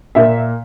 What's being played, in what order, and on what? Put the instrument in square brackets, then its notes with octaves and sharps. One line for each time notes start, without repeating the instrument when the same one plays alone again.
[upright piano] A#2 A#3 E5